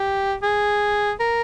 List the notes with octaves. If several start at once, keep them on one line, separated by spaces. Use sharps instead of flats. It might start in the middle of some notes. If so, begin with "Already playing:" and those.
Already playing: G4
G#4
A#4